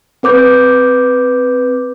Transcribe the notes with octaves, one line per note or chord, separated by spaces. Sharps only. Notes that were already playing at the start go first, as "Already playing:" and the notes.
C4 B4 D6 G6